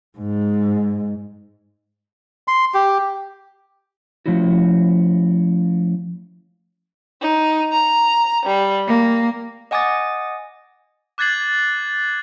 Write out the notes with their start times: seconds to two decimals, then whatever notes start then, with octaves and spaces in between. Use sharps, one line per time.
0.19 G#2
2.48 C6
2.74 G4
4.26 F3 A3 C#4 E4 F#4
7.21 D#4
7.71 A#5
8.45 G3
8.88 A#3
9.71 D#5 F#5 G#5 D6 D#6 A6
11.18 D6 F#6 G#6 A6 C7 F#7